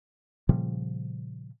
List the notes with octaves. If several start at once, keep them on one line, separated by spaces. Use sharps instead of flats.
A#2 C#3 F3 G3